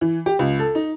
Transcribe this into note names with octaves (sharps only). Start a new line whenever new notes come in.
E3
G4
C#2
A4
D#4